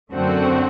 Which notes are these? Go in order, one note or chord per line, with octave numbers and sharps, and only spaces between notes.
F#2 D3 A3 C4 F#4